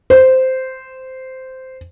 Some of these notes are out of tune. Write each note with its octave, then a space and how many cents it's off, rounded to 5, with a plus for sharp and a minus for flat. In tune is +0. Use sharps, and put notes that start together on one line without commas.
C5 -10